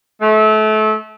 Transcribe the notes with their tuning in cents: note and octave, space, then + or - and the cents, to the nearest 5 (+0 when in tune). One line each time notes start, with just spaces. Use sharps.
A3 -30